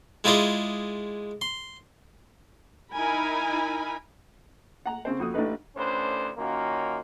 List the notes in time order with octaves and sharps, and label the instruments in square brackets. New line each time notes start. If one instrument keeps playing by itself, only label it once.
[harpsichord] G#3 E4 F4 G#4 D5 D#5
C6
[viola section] D#4 E4 A#4 G#5 B5
[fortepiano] F#5 A#5
C#3 C4 C5
F2 F#4 D#6
A1 A3 D4 D#4 B4
[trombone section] D2 A2 C#4 D4 B4 C5
F#2 D#3 A#3 C#4 F4 F#4